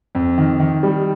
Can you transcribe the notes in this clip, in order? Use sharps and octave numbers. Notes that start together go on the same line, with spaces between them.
F2
D#3
D#3
G3